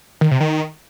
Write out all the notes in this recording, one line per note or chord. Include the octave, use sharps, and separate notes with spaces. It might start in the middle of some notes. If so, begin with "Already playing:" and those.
D#3
C3
D#3